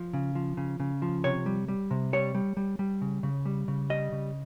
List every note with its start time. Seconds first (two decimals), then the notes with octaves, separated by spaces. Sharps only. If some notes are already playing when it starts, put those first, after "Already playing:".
Already playing: F3
0.14 C#3
0.35 F3
0.57 C#3
0.80 C#3
1.02 F3
1.24 C3 C#5
1.46 G3
1.68 G3
1.91 C3
2.13 G3 C#5
2.35 G3
2.57 G3
2.79 G3
3.02 C#3
3.23 C#3
3.46 G3
3.68 C#3
3.90 G3 D#5
4.12 C#3